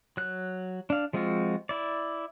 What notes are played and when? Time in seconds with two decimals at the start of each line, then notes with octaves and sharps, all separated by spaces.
0.17 F#3 F#6
0.90 D4 F5
1.13 F3 G#3 C4 F4 F#4
1.69 E4 D5